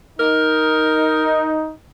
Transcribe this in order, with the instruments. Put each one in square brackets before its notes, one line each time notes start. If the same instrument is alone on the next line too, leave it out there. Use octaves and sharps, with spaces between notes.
[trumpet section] D#4 [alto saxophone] A#4